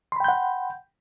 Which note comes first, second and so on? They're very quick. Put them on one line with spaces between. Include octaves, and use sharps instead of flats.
C6 B5 G5 G6 F#5